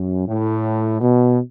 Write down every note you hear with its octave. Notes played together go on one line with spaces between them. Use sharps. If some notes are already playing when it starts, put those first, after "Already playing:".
Already playing: F#2
A2
B2